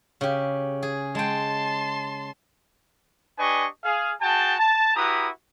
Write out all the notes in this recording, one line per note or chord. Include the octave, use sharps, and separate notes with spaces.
C#3 G4
G#4
G#3 G5 A5 C6
D4 G4 B4 D#5 G#5 C#6
G#4 F5
F#4 G#4 G5 A5
A5
E4 F#4 G4 B4 A#5 D#6